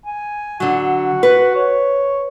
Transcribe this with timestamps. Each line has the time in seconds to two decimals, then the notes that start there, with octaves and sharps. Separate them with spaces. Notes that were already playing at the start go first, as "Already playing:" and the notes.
0.06 G#5
0.60 D3 F#3 F#4
1.23 B4
1.55 C#5